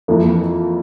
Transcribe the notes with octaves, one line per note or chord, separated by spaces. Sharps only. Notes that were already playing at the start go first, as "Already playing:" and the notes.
F2 E3 A#3